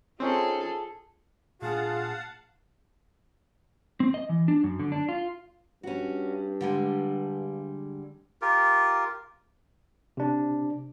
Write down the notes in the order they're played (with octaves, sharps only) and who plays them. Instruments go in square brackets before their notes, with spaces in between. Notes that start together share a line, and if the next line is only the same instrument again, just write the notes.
[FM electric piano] C4 C#4 D#4 [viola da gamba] F4 G#4 A4
[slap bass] A#2 A3 D4 [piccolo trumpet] F4 [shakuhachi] G#4 [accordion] F5 F#5 A5
[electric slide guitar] C4
D#5
E3
D4
F#2
D3
D4
F4
[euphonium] G2 [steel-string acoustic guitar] C#4 F#4
[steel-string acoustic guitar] D3 G3 G#3
[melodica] F4 G4 A#4
[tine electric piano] C3 D4